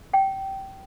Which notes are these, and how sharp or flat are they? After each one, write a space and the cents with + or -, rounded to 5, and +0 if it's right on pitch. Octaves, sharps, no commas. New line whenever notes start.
G5 -20